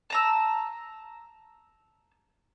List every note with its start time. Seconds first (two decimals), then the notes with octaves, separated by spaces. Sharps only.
0.10 A5 A#5 E6